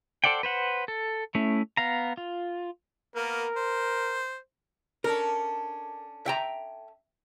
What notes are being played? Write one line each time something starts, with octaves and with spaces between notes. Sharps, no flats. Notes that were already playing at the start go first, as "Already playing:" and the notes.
A4 C5 D5 F#5 G5
B4 C5 F#5
A4
A3 C#4 E4
B3 F5 A#5
F4
A#3 B3 A#4
C5
C#4 D4 A4 A#4
E5 G5 A#5